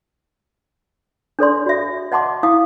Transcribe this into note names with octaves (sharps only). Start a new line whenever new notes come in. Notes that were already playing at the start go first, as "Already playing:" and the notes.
D4 A4 D5 C6
F#4 E5
D#5 F#5 A5 C6 D6
E4 F5 D#6